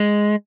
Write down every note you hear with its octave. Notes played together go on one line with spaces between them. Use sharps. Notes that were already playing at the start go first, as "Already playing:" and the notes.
Already playing: G#3